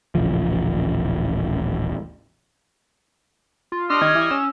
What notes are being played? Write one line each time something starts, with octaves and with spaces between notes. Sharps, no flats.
D#1 A1 C#3 F3
F4
G3 D4 D#5 C6 F6
D#3 G#6
E3
C#4 E6